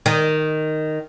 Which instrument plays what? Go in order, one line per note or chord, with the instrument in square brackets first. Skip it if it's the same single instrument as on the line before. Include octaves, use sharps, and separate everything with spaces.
[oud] D#3